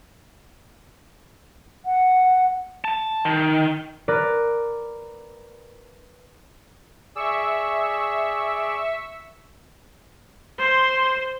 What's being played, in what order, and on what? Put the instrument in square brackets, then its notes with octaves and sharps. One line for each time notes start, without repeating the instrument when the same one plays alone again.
[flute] F#5
[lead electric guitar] A5
D#3
[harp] A#4 B4 D5
[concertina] G#4 D5 [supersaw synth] E5 C#6 E6
[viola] C5 C6